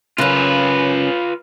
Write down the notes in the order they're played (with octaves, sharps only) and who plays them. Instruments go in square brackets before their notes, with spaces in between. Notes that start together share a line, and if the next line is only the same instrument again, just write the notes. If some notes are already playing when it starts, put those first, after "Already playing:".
[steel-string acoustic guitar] F#2 C#3 [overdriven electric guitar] F4 B4